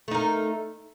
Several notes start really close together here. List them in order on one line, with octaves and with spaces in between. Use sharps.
A3 D#4 A#4